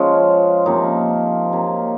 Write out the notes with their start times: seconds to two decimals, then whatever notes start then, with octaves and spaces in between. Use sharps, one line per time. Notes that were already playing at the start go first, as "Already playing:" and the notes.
Already playing: C#3 F3 G#3 C#4 F4
0.66 C3 F3 A#3 D#4
1.52 C3 F#3 A#3